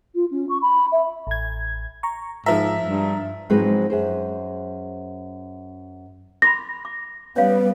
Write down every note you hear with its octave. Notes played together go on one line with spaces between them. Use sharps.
F4
C#4
C#6
B5
E5
A1 G#6
A#5 C#6
G#2 F3 E5 A#5
G2
G#2 F3 F#3 G#3 C4 B4
F#2 G#4 C5
B5 C6 D6 A#6
D6
G3 B3 C#4 B4 C#5 F5